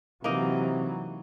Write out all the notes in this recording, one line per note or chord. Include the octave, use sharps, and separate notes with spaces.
C3 E3 F#3 A#3 D#4 D#5